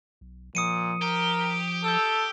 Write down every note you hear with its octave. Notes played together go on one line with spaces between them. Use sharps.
B1
A#2 F3 D#6 C#7 D#7
G4 A#4
A4 E6 G6